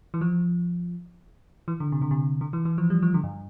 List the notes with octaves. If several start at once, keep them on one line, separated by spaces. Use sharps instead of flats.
E3
F3
E3
D3
C3
D3
C3
D3
E3
E3
F3
G3
F3
D3
G2